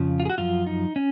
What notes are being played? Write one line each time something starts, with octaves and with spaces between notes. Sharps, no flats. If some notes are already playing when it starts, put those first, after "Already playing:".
Already playing: F2 C#3 F3
F4
G#4
F#4
F#2 F3 F4
D#4
C#4